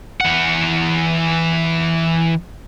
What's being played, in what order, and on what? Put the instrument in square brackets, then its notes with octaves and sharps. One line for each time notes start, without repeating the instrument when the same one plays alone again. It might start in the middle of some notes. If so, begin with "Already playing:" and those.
[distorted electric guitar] E3 F#5